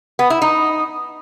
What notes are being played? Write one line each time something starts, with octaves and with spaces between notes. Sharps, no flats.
B3
E4
D#4